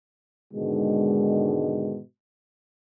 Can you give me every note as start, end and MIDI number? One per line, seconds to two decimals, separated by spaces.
0.54 1.99 44
0.54 1.99 47
0.54 1.99 50
0.54 1.99 51
0.54 1.99 56